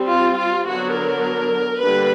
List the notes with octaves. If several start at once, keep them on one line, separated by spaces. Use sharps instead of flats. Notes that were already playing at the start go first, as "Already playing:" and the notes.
Already playing: G3 C4
F4
F4
D3 F#3 B3 D4 F#4
A#4
D3 G3 A#3 D4 B4